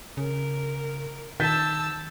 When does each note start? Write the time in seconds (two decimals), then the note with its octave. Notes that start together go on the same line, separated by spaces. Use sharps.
0.17 C#3 A#4
1.40 D#3 A5 E6 G6 A6 B6